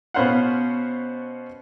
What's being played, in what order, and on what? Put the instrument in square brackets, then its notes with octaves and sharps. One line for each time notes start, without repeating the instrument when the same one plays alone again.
[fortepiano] B2 B3 C#4 C5 F5 F#5